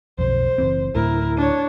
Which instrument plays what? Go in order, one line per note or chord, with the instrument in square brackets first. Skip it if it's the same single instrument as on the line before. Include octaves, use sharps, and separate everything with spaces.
[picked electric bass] B1 F2 [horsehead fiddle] C5
[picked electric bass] F#1 E3 C4
[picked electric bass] D2 A2 [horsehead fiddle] E4 A#4
[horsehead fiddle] D4 C#5